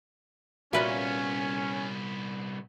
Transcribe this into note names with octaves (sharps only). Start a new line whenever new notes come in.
C2 A#2 B3 C#4 F#4 B4 D#5 E5